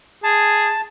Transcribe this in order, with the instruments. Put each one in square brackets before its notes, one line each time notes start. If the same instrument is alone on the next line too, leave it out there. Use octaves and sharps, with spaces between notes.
[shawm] G#4 [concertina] A5